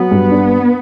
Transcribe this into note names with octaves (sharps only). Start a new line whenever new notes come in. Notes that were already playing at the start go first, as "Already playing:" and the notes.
Already playing: F#3 B3
G2
D4